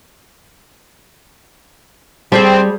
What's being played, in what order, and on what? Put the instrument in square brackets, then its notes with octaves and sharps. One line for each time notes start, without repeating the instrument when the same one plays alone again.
[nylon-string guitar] G3 [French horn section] C4 [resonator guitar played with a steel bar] G#4 C5 A5